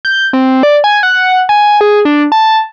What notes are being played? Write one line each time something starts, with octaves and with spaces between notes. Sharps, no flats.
G6
C4
D5
G#5
F#5
G#5
G#4
D4
A5